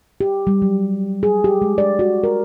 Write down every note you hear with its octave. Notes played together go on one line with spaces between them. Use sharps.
G4
G3
F#3
G#4
G4
G#3
D5
F#4
A#4